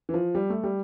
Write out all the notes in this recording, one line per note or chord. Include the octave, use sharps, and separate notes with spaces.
E3
F3
G3
A3
G3